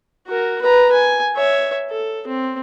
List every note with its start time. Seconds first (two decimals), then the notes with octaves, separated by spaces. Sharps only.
0.27 F#4 A#4
0.62 B4 A#5
0.92 G#5
1.36 C#5 E5
1.91 A4
2.27 C4